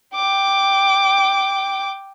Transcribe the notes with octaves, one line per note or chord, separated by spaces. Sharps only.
G5 D6